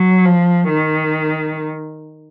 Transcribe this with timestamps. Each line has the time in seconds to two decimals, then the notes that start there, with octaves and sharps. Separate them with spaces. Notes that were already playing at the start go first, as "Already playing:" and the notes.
Already playing: F#3
0.25 F3
0.68 D#3